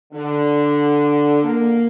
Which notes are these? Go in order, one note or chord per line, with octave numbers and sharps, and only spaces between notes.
D3
A#3